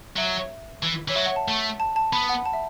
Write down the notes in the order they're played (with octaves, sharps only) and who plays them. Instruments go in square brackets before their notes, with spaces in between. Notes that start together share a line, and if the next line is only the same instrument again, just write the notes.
[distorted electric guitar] F#3 [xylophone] E5
[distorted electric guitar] E3
[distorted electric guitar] E3 [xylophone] C#5
[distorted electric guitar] F#3 [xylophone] E5
[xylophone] F#5
A5
[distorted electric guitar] A3
[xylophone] A5
A5
[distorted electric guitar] B3 [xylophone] B5
[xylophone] F#5
A5
E5